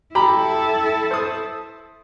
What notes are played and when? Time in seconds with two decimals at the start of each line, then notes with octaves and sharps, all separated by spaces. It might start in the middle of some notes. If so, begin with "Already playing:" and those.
0.15 E4 G4 A4 A#5 B5
1.11 C5 D#6